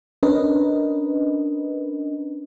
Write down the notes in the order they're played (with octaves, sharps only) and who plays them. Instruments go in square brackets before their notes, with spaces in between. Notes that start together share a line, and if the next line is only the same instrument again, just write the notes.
[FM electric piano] C#4 D4 A#4 B4 D#5